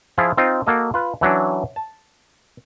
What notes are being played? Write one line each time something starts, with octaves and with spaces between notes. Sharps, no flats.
F3 E4 F4 G#4
C4 D#4 F4
A#3 F#4 A4 D#5
F4 B4
E3 F#3 C#4 D4
A5